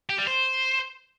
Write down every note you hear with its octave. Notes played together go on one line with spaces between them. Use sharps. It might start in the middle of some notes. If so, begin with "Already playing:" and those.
G4
G3
C5